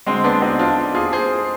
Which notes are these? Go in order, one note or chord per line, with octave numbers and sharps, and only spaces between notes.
D3 G#3 C4
B3 D4
C4 D#4
D4 F4
F4 G#4
G#4 C5